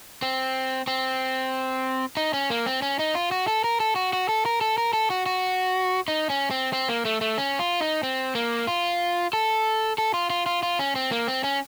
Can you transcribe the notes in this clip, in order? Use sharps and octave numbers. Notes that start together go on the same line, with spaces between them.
C4
C4
D#4
C#4
A#3
C4
C#4
D#4
F4
F#4
A4
A#4
A4
F#4
F#4
A4
A#4
A4
A#4
A4
F#4
F#4
D#4
C#4
C4
C4
A#3
A3
A3
C#4
F4
D#4
C4
A#3
F4
A4
A4
F4
F4
F4
F4
C#4
C4
A#3
C4
C#4